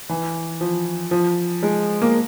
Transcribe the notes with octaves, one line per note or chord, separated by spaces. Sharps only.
E3
F3
F3
G#3
A#3